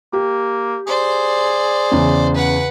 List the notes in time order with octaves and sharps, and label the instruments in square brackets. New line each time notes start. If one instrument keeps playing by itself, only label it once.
[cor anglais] A#3 [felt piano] G4
[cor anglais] G#4 [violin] C5 D5
[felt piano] E2 C#3
[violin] B4 F#5